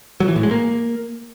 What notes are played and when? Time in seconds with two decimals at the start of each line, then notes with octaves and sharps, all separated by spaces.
0.20 F#3
0.28 E3
0.36 A2
0.43 G#3
0.51 A#3